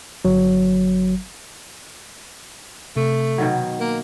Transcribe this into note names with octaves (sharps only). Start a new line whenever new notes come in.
G1 F#3
C3 A3
B2 D#3 F#3
A#3